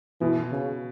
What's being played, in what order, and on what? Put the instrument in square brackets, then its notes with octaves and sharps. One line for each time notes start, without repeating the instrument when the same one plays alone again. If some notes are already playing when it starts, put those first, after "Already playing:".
[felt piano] B2 [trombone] E3
[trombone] C#3